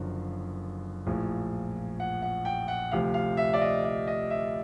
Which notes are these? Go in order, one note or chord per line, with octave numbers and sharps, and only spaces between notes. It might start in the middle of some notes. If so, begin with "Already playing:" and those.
Already playing: F#1 F#2 D3 F3
A#1 A2 F3
F#5
F#5
G5
F#5
D2 C3 F3 F5
F5
E5
D5
D#5
D5
D#5
E5